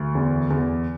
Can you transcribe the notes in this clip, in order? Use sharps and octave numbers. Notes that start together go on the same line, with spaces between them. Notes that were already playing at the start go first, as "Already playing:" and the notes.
Already playing: D2
E2
E2